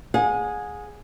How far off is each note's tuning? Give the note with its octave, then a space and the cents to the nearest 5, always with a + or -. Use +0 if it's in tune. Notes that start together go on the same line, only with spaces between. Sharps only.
G#4 +0 F#5 -40